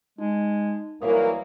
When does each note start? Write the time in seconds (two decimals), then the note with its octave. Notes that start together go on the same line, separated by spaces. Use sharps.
0.18 G#3 D#4
1.02 C2 E3 F#3 A#3 C#5 E5 F5 D#6